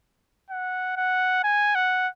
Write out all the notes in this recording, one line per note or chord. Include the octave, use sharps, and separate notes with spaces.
F#5
F#5
G#5
F#5